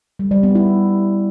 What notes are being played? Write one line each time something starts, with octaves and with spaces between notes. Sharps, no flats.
G3
G3
B3
E4